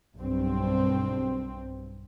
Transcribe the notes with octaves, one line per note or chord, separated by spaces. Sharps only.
B1 G2 C4